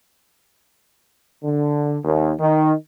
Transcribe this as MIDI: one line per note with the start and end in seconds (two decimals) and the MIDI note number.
1.43 1.97 50
2.04 2.32 39
2.40 2.73 51